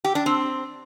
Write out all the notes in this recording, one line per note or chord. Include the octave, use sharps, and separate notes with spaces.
G4
D4
C4